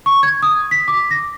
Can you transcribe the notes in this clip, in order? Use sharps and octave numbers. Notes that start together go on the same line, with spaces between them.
C#6
G#6
D#6
B6
D6
A#6